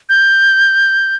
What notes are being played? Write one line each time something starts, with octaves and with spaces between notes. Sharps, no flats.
G6